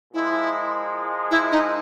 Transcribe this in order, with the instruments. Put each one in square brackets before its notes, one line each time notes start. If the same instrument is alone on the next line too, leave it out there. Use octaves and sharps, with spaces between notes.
[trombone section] A#2 F3 G#3 [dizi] E4
[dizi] E4
D#4